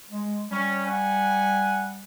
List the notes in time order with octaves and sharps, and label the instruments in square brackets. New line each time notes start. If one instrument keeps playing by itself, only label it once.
[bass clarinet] G#3
[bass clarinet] G3 [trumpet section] C#4
[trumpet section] F#5 G#5